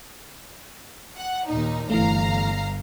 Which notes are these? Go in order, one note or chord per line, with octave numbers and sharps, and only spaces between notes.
F#5
D#2 A#2 D#4
G1 E3 A3 F5 A#5